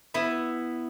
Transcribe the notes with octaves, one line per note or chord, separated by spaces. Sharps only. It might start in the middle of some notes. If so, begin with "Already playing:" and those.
B3 E4 E5